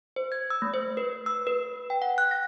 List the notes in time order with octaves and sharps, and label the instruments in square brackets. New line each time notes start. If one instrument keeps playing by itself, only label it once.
[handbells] C5
G#6
E6
A3
C5
B4
E6
B4
G5
F#5
F#6
A#6